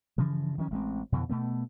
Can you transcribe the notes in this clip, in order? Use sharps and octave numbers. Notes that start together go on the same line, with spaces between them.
G2 C#3 E3 F3
D#3 F3 G#3 C#4
A1 G#3 C4
F2 B2 D3 E3
B2 A3 B3